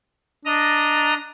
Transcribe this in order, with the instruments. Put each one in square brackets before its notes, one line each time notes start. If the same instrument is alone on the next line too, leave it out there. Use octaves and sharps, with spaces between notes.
[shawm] D4 [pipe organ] D#5 A#5